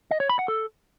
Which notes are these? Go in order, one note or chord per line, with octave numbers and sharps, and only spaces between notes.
D#5
C#5
B5
F#5
A4